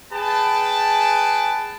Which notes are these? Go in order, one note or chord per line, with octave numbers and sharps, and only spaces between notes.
G#4 B4 G5 A5